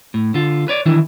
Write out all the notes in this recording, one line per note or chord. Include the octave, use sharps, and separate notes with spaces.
A2
D3 F4
B4 C#5 D5
D#3 E3 D4 E4